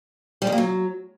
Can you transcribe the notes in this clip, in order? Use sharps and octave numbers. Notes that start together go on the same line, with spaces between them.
G3
D#3
A#3
F#3